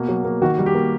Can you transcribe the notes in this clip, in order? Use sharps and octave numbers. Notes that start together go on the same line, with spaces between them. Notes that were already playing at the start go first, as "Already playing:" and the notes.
Already playing: B2 A#3
F#3
A#3
D#3 F#4
G3
G4
A#3